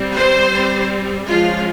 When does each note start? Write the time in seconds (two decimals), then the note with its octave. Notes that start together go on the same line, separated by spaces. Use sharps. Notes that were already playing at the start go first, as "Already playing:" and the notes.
Already playing: G3 C4
0.13 C5
0.52 G3 C4
1.28 F3 G#3 C#4 F4